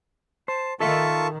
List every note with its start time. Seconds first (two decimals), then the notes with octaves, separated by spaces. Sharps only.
0.48 C5 A5
0.80 D#3 F4 A4 E5 A5 C#6